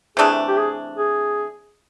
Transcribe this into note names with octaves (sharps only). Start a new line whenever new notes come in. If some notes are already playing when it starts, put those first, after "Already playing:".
C3 E3 A3 D4 G#4
G4
G#4
G#4